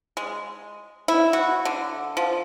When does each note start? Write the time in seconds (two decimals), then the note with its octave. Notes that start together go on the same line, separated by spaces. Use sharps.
0.17 G#3
1.08 E4
1.33 F#4
1.65 D3
2.17 F3